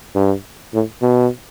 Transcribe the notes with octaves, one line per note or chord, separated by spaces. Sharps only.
G2
A2
B2